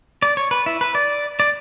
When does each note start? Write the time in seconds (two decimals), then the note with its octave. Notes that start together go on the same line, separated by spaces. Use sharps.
0.22 D5
0.37 C#5
0.51 B4
0.66 E4
0.81 B4
0.95 D5
1.40 D5